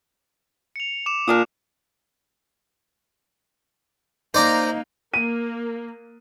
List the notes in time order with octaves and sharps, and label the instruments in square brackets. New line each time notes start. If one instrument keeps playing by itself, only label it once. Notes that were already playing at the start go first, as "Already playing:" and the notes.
[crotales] C#7 F7
D6 E7
[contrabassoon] A#2 [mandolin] A#3 D4 D#6
[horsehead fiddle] A#3 D#4 [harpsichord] C5 D5 A#5
[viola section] A#3 [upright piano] D#7